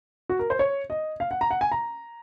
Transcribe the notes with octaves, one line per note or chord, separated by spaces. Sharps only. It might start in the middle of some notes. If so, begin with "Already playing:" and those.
F#4
A#4
C5
C#5
D#5
F5
F#5
A#5
F#5
G#5
A#5